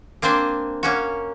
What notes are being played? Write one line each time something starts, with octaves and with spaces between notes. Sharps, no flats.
A#3 C4 D4 C5 G#5
A#3 C#4 F#4